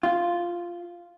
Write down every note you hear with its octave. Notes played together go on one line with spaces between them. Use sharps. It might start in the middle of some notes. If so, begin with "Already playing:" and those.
F4